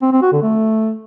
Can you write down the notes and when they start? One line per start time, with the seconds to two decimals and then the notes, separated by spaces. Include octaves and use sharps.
0.02 C4
0.12 C4
0.22 F#4
0.32 D3
0.42 A3